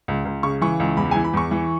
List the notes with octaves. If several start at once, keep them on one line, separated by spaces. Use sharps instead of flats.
C#2
C#2
C#3 C#6
E3 C#6
C#2
E2 B5
G#5
E3
B5
E2 C#6
E3